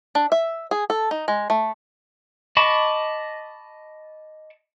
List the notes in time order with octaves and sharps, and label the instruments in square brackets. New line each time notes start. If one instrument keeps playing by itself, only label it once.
[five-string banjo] D4
E5
G#4
A4
D#4
G#3
A3
[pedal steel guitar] D#5 A5 B5 C#6 D6